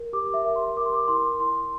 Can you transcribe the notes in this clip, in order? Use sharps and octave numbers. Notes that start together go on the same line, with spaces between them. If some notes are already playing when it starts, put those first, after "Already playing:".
Already playing: A#4
G4 D6
E5
A#4
C6
A#4 D6
C6
D6
E4 C6
E4 C6